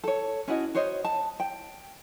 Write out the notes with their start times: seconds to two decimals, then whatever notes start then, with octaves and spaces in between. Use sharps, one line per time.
0.04 A4 C#5
0.48 C#4 E4 F#4 D#5
0.75 F#4 C5 C#5 D#5
1.04 A5
1.40 G5